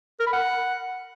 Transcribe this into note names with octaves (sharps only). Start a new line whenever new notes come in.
A#4
B5
F#5